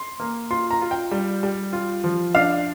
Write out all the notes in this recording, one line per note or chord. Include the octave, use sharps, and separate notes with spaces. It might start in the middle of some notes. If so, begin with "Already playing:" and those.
Already playing: C6
A#3
F4 C6
A#5
F4
G5
G3
G3
F4
F3
D4 F5